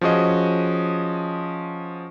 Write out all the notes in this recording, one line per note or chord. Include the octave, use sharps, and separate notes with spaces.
F3 C#4 F#4 G#4 D#5